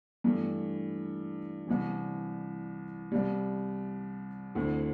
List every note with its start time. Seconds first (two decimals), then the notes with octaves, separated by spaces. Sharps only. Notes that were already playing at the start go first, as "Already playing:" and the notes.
0.24 G2 E3 A3
1.67 C2 C3 E3
3.12 C2 C3 G3
4.55 D2 D3 A3 C4 E4